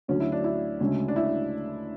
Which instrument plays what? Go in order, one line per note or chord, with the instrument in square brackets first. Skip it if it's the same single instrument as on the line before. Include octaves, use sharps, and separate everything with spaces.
[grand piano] D2 D3 F#3 [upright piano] C#4
[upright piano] E4
D4
E4
[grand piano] D2 C#3 G#3 C#4
[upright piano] D4
E4